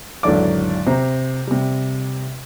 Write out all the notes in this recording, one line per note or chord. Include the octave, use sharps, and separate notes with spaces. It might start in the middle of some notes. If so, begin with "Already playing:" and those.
G#1 E2 D3 F#3 D5 D6
C3 C5 A#5
C3 G3